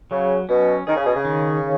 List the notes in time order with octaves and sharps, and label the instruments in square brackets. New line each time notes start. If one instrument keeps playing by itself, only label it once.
[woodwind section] C#3 [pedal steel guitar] F#3
[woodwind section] B2 [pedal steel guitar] C#4
[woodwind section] D#3 [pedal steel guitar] G#4
[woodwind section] C#3
B2
C#3
[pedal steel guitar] D#3